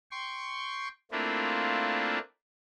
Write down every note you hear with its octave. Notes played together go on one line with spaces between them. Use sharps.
G5 C6 C#6
A3 A#3 C4 D4 E4 F4